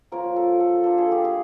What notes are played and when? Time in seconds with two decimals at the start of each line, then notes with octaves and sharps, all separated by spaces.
0.12 F3 A#3 C#4 F4 A#4
0.36 A4
0.60 A4
0.84 A#3 D4 F4 A4
0.98 G#4
1.12 G4
1.25 G#4